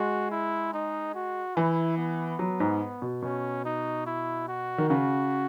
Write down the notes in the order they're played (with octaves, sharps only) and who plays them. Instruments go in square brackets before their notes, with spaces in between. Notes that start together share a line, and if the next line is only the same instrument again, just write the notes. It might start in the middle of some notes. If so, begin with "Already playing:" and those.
Already playing: [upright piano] G#3 [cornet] F#4
[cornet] E4
D#4
F#4
[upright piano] E3 [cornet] E4
[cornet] B3
[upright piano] F#3
G#2
B2
[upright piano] B2 [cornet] C#4
[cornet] D#4
E4
F#4
[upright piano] D#3
[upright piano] C#3 [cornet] F#4